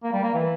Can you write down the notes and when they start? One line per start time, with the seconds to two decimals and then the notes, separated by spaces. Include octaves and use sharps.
0.04 A#3
0.13 G3
0.23 A#3
0.34 E3